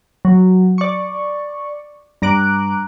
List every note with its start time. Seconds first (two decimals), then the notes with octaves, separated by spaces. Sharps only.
0.25 F#3
0.78 D5 C#6
2.22 G2 A#5 D6 F#6 D7